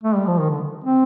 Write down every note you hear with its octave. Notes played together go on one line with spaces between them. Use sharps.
A3
G3
F3
D#3
D3
C4